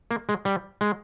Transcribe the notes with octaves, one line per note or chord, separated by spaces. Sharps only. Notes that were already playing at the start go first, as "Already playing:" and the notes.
A#3
G#3
G3
G#3